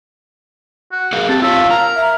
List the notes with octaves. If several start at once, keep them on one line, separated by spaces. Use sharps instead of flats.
F#4
G#4 A#4 F5
C4 C#4 G4 A5
F4 C#5 E5 F5 A5
A#4 A#5
E5